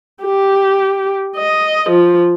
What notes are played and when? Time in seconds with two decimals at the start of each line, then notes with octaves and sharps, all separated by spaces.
0.23 G4
1.37 D#5
1.89 F3